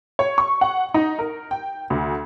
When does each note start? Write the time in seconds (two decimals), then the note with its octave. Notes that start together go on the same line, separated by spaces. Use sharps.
0.19 C#5
0.38 C#6
0.61 F#5
0.94 D#4
1.19 A#4
1.51 G5
1.90 D2